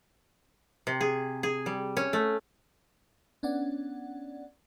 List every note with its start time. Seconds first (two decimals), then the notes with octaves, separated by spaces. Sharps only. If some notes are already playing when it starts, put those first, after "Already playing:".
0.87 C3
1.01 G#4
1.43 G#4
1.66 G3
1.97 C#4
2.13 A3
3.43 B3 C#4 D4 D5 F#5